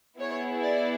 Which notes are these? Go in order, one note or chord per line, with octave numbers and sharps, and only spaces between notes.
B3 E4 G#4 C#5
D5